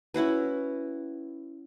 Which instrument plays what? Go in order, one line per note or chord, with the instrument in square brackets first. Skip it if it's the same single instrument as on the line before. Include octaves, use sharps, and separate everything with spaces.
[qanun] C#4 E4 F#4 B4